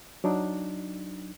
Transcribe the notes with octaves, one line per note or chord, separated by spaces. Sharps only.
F#3 D4 D#4